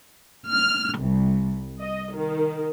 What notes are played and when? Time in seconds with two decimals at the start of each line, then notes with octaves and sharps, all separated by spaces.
0.47 F6
0.97 C2
1.79 D#5
2.14 D#3